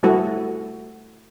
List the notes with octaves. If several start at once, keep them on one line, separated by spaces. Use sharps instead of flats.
G3 A3 E4 F#4